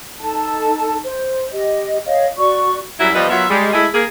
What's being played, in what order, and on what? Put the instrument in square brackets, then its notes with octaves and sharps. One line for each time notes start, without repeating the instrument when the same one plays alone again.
[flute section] D#4 A4 A5
C5
G4 D#5
C#5 D#5 F5
F#4 D5 C#6
[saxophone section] F#2 F#3 G3 E4
F3 G3 B3 B4 D#5
F#3 B3 F4 A#4 E5
G3 G#3
G#3 A3 E4 G#4 D#5 E5
A#3 G#4